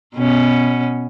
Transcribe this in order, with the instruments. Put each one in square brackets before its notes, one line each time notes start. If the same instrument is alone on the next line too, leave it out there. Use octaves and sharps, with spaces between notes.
[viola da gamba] B2 B3 C#4